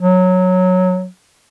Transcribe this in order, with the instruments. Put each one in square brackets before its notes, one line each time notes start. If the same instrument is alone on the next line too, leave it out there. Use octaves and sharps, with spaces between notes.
[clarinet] F#3